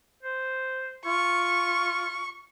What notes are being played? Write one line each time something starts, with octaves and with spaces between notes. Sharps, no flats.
C5
F4 C#6